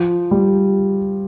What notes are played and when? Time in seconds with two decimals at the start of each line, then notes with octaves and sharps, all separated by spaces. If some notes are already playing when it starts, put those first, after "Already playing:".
Already playing: F3
0.31 G3